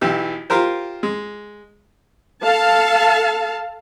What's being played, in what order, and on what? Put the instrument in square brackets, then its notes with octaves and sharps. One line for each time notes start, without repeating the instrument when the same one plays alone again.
[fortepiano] B1 E3 G4
F4 G4 A#4 C5
G#3
[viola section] A4 F5 A5